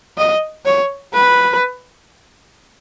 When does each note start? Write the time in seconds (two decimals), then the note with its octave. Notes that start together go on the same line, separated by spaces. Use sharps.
0.18 D#5
0.66 C#5
1.13 B4